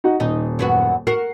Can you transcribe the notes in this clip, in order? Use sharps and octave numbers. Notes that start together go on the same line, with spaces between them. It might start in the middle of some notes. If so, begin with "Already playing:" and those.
D#4 F#4 F#5
D#1 D#4
F#2 B3 F#4
F#4 A#4 C7